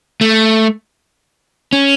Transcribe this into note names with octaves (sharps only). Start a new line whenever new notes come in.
A3
C#4